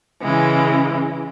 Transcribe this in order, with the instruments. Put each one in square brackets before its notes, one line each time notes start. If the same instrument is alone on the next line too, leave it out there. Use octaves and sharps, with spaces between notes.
[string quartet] C#3 E3 G#3